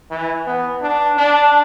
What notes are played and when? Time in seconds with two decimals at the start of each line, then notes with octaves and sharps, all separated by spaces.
0.11 E3
0.47 B3
0.82 D4
1.18 D4